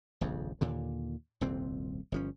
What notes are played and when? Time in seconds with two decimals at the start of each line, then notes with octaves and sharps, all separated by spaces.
0.21 D#1 A#1 F2 C#3
0.61 D#2 A#2 D3
1.41 D#1 C2 F2 C4
2.12 G1 F3 C#4